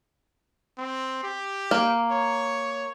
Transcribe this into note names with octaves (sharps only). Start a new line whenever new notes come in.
C4
G4
A#3
C#5